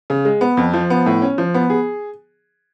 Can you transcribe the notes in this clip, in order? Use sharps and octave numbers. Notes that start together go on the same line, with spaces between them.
C#3
G#3
B3
F2
F3
B3
A2
C#4
F3
B3
G#4